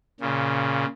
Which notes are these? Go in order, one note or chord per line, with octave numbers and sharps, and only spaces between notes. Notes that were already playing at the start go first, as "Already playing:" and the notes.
A#2 C#3